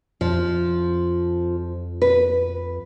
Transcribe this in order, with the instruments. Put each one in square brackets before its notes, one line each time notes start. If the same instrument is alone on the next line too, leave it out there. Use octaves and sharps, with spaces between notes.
[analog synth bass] F2 [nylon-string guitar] F3
[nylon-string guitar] B4